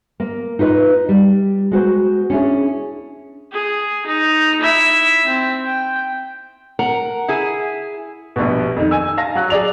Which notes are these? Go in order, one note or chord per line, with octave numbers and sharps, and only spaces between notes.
A#3
D#4 F4 B4 D5 D#5
G3
G#3 F#4 C5
C#4 D4 E4 G#4
G#4
D#4
E4 E5
C4
G5
A#4 F#5
E4 G#4
A#1 G2 B2
F2 D#3
G#5 E6
F5 A5 A#6
F#3 F#6
G#4 D5 F7